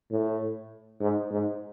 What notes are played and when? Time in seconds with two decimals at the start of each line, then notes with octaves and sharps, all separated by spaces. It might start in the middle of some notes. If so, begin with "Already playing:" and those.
0.11 A2
1.00 G#2
1.31 G#2